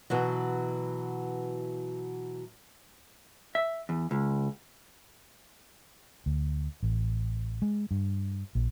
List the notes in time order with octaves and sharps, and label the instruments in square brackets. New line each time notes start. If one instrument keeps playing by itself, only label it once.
[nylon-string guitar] B2 E3 F#3
[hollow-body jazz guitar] E5
E2
C#2
[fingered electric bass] D2
A1
G#3
G2
A#1